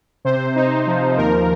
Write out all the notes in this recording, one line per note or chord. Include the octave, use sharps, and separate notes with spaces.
C3 C5
D#4
F3
D#2 A#4